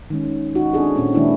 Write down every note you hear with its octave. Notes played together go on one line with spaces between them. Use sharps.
D#3 G#3 C#4
D#4 F#4
C4 D4 E4 G#4 A4
A#2 C4 C#4
D#3 G#3 A#3 D4 E4